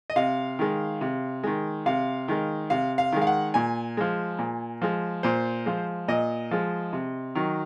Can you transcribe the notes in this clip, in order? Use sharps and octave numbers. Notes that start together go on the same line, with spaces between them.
D#5
C3 F5
D#3 G#3
C3
D#3 G#3
C3 F5
D#3 G#3
C3 F5
F5
D#3 G#3
F5
F#5
A#2 G#5
F3 G#3
A#2
F3 G#3
A#2 C5
F3 G#3
A#2 D#5
F3 G#3
C3
D#3 F#3